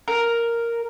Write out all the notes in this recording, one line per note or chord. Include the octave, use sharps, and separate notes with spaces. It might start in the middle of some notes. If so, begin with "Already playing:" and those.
A#4